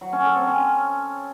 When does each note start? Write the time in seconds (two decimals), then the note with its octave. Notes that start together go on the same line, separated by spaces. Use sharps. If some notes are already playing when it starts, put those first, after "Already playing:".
0.01 F#3
0.13 C#4
0.24 A4
0.36 C4
0.47 C#4